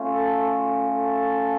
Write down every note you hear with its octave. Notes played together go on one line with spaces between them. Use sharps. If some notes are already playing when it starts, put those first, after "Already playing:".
Already playing: A3 C#4 F4
A4
A4